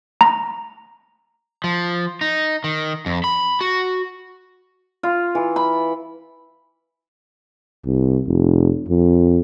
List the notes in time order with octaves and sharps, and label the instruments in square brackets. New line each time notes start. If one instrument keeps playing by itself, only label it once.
[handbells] A#5
[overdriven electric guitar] F3
D#4
D#3
F2
B5
F#4
[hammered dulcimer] F4
E3
B5
[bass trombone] C2
F1
F2